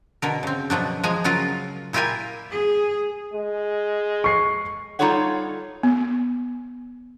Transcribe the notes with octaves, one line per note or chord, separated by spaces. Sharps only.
B2 D3 A#4
C#3 C4
B2 F3 F#3 D4
F3 G#3 G#5 A#5
C#3 F#3 F4 A#4
A#2 E4 F4 G4 A#4 G#5
G#4
G#3
C#6 C7
G3 D#4 F4 A4 C#5 F#5
B3